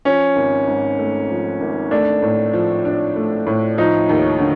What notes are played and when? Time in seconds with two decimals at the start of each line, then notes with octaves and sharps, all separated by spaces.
0.05 F3 C#4
0.36 G#1
0.67 G#2
0.99 A3
1.29 F3
1.60 G#1
1.91 A3 D4
2.22 A2
2.53 F3
2.85 D4
3.16 A3
3.47 A2
3.78 F3 D#4
4.09 D#2
4.39 D3